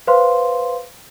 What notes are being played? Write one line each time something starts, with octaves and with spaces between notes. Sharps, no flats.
B4 C5 F5 C6